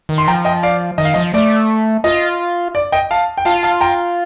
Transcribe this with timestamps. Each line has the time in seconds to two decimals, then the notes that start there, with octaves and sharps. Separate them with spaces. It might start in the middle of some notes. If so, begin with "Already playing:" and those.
0.09 D#3
0.18 C6
0.27 F3 G5 A#5
0.45 D#5 G5
0.63 D5 F5
0.98 D#3 D#5
1.05 F5
1.14 F3 D#5
1.34 A3 D5
2.04 F4 D#5
2.75 D5
2.92 D#5 G5
3.11 F5 A5
3.38 G5
3.45 F4 F5 A5
3.63 F5 A5
3.81 G5 A#5